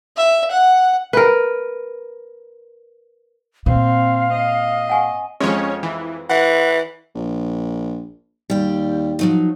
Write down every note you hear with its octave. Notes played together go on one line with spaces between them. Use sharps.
E5
F#5
A#4 B4
A#2 C4 F5
D#5
F#5 G#5 C#6
F2 G#3 C#4 C#5
E3
E3 F#5
A#1
D#2 G3 G5
F3 F#3 D#4